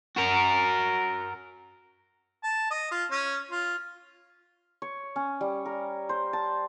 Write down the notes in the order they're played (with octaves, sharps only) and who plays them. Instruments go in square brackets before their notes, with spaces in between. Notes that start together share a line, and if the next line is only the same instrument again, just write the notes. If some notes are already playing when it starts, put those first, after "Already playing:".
[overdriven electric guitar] F#4 A#4
[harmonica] A5
D#5
F4
C#4
F4
[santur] C#5
C#4
G3
A#4
C5
A5